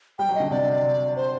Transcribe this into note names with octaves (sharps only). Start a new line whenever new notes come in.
G3 G5
F#3
D3 D#5
C3 D5
C5